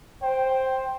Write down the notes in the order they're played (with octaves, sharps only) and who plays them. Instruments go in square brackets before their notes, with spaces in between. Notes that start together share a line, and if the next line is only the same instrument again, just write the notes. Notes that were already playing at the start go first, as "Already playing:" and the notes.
[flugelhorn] C5 [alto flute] G5